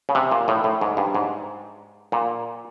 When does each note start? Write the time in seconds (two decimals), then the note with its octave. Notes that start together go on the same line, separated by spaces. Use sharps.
0.09 C#3
0.15 C3
0.32 A#2
0.48 A2
0.64 A2
0.81 G#2
0.97 G2
1.14 G#2
2.12 A#2